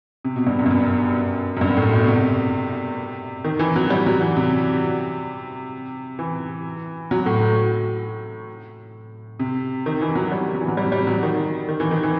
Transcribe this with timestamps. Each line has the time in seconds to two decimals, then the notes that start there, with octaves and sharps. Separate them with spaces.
0.25 C3
0.36 B2
0.47 G2
0.59 F#2
0.66 G2
0.71 F#2
1.57 F#2
1.61 G2
1.77 A2
1.92 B2
2.07 C3
3.44 D#3
3.59 E3
3.76 F#3
3.90 G3
4.06 F#3
4.21 E3
4.37 C3
6.19 E3
7.11 F#3
7.26 A2
9.39 C3
9.86 D#3
10.01 E3
10.15 F#3
10.32 G3
10.54 F#3
10.61 E3
10.68 F#3
10.77 G3
10.92 G3
11.07 F#3
11.23 D#3
11.68 D#3
11.80 E3
11.91 D#3
12.03 E3